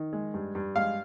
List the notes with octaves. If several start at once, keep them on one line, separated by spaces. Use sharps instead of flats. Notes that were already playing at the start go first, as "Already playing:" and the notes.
Already playing: D#3
G#3
G2
G2
G#3 F5